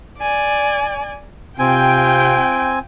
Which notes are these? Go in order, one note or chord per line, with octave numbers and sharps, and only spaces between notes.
D5 G#5
C3 C4 F4 G5 G#5